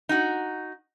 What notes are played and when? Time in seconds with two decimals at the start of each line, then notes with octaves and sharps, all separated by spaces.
0.09 D#4 F#4